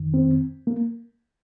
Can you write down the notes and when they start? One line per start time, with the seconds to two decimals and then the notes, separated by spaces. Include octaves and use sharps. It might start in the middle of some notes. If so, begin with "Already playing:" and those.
Already playing: F2 D#3
0.14 C4
0.67 A#3